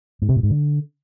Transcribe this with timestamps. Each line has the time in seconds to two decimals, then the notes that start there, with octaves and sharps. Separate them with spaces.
0.22 G#2
0.29 C3
0.36 A2
0.43 G#2
0.50 D3